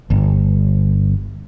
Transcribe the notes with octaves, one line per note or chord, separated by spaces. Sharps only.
G1